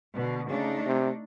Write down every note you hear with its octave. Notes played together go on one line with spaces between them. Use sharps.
B2 D3
C#3 A3 D4 D#4
C3